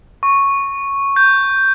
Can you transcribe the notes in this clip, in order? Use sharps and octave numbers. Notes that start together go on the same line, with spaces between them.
C#6
G6